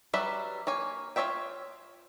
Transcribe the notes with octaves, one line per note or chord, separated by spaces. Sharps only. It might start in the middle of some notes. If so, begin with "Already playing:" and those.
F#3 G3 B4 E5
A#3 C#5 G#5
F4 A4 C#5 E5 G5